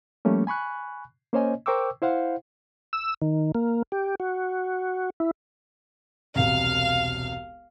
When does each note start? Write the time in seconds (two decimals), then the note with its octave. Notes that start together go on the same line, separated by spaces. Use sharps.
0.25 F3 G3 A3 A#3 C#4
0.47 G#5 B5 C#6 F#6
1.33 A#3 C#4 C5 C#5 D#5 G#5
1.66 A#4 C5 G5 C#6 D6 E6
2.02 E4 C5 F5 F#5
2.93 E6
3.22 D#3
3.55 A#3
3.92 G4
4.20 F#4
5.20 E4
6.35 E1 C2 F5